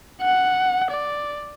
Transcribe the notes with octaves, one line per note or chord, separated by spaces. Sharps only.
F#5
D5